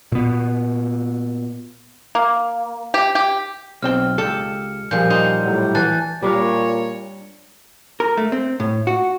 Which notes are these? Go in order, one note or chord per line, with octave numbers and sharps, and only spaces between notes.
A#2 B3
A#3
G4
G4
B1 C4 G5 F6
C#2 G4 A4 G5 C#7
A#2 F3 G3 G#4 G6
D#4 C5 G6
A2 F#3 G3
E3 A5 F#6 A6
A#2 G3 D4 A#4 C#5
A#4
A3
C4
A2
F#4